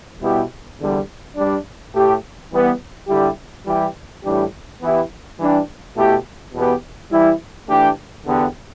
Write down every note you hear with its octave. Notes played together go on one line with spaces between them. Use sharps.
B2 G3 B3 E4 G4
E2 D3 G3
G2 G3 D4
A2 A3 G4
E3 G3 B3
D3 G3 E4 G4
E3 G3 E4 G4
A2 E3 G3 D4 G4
E3 B3 E4 G4
E3 G3 D4 G4
B2 A3 E4 G4
E2 B2 B3 G4
E3 G3 E4
E3 A3 D4 G4
E2 D3 B3 G4